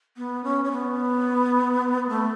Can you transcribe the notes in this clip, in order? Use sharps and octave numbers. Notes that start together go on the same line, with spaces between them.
B3
C#4
C#4
B3
A3